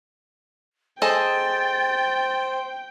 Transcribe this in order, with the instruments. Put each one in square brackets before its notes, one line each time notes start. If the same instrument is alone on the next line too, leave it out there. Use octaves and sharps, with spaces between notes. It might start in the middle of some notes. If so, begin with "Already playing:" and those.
[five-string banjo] G#4 A4 D#5 [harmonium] C5 [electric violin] G5 [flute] A6